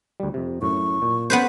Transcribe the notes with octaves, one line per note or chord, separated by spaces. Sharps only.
D2 G3
F2 C3
F#2 A2 C#6
A#2
B3 C#4 B4 C5